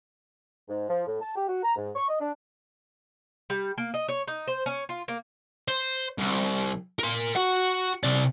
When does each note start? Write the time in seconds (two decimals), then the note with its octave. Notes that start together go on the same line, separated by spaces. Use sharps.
0.69 G#2
0.89 F3
1.07 A2
1.21 A5
1.36 G4
1.48 F#4
1.63 A#5
1.76 G#2
1.96 C#6
2.09 D#5
2.21 D4
3.50 G3
3.78 A#3
3.94 D#5
4.08 C#5
4.27 D#4
4.47 C5
4.66 C#4
4.89 F4
5.08 A#3
5.68 C5
6.18 C2
6.99 A#4 C6
7.36 F#4 F#5
8.03 C3 D5